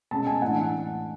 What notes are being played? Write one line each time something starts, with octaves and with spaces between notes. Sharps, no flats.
B2 G#3 C#4 A5
G#5
A2 E3 A3 D4 F#5